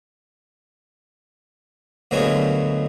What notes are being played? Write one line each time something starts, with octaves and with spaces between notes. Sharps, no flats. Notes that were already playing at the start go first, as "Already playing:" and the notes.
D2 A#2 F#3 G#3 B3 G#5